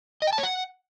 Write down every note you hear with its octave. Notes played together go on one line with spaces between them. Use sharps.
D#5
G5
A5
C#5
F#5